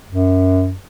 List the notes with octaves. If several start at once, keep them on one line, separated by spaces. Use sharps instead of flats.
F#2